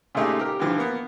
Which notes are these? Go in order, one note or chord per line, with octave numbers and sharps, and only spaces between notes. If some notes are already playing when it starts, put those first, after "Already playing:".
A#2 C#3 G#3 A3 D#4 G4
G4 A#4
G2 D3 E3 F3
A#3 B3